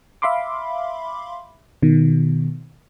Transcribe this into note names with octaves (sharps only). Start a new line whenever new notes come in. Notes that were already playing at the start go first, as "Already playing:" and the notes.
E5 F5 B5 C6 D6
B2 D#3